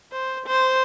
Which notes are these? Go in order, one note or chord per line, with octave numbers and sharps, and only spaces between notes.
C5
C5